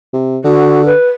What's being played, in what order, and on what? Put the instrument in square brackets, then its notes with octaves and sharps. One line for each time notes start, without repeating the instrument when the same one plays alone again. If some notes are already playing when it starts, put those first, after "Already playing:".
[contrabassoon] C3
[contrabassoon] D3 [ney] F#4
[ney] B4